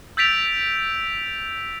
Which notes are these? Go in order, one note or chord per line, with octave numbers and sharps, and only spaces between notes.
E6 G6 A6 B6 D7 F7